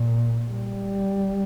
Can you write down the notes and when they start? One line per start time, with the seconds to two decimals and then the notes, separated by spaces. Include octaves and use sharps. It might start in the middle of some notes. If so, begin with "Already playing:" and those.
Already playing: A#2
0.49 G3